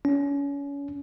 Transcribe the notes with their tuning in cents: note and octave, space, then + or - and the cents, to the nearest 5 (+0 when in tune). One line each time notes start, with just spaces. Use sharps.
C#4 +30